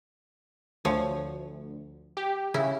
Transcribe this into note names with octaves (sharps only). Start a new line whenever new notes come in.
D2 F3 C#5
G4
C#3 E4